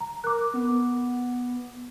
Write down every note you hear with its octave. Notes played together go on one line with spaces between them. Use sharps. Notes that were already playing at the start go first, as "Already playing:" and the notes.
A#5
A#4 D6 F#6
B3